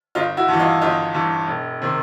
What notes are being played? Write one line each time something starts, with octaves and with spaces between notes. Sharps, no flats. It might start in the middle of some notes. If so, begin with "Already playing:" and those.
G1 D#4 F4
E4 F#4
G2 E3
D#4 F4
G1 D#4 F4
G2 E3
E1
C3 D#3